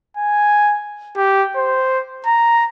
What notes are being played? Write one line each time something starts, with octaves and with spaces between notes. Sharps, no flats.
G#5
G4
C5
A#5